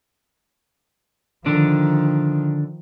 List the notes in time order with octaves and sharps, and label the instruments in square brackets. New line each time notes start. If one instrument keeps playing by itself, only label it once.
[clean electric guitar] D3 D4 [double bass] D#3 F3